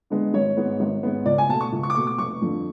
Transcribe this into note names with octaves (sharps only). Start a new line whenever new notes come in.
D3 G#3 B3
G#1 C#5
G#2 G#3 B3
G#1
G#2 G#3 B3
C#2 D5
G#5
B2 A3 A5
C#6
C#2
C#6
D6
B2 A3 C#6
D6
F1 C#6
F2 D3 F3 A3